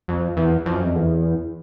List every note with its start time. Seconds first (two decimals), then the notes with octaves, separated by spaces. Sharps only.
0.08 F2
0.37 E2
0.66 F2
0.75 F#2
0.84 F2
0.95 E2